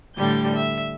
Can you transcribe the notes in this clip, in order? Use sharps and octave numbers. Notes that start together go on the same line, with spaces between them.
A2 D3 G3 G4 G6
E5